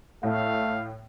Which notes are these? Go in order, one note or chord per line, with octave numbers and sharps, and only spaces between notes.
A2 A3 F5